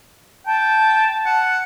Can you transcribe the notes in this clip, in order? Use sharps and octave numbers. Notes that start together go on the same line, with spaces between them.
G5 A5
F#5